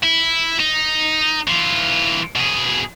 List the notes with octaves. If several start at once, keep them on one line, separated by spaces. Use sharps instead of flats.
E4
D#4
E3 F4
B2 G#4